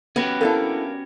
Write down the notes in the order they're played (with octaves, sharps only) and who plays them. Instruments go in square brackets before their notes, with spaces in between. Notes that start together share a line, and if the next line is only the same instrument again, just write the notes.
[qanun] B3 B4 [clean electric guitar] C#4 F#4 G4
[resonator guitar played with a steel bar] A#3 D4 [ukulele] E4 A4